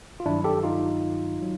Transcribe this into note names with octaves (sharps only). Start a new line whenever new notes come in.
F4
G2 D#3 F#3 D4 E4
G4 A4
D#4 F4
F#3